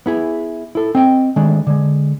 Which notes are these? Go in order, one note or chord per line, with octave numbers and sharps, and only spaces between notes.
B3 E4 G#4
E4 A4
C4 D#5 G5
D#3 G#3 A3 D4
D3 G#3